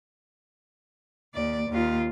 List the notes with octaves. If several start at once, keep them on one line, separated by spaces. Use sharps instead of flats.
D#2 D5
D#2 F4